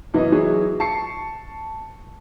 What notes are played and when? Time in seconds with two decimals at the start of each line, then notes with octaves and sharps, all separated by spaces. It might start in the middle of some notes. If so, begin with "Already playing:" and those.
0.14 F#2 E3 F#3 B3 D#5
0.32 E3 F#3 B3 G#4 C#5
0.80 A5 C#6 C7 C#7